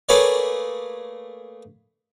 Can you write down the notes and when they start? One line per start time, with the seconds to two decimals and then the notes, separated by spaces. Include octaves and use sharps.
0.09 A3 A#3 G#4 B4 C#5 D5